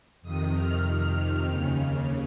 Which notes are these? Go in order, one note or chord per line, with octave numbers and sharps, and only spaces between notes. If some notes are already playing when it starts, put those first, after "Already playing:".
F2 C3 D#3 D#6
F6
F6
D#2 C#3